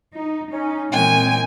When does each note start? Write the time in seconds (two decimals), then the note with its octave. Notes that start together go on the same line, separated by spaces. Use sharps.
0.14 D#4
0.51 C#4 D#4
0.92 F#2 A#2 E3 G#3 C4 G5 G#5